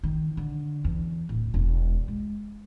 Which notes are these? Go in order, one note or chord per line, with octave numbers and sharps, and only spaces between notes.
D#3
D3
E2
D1
E1
G#3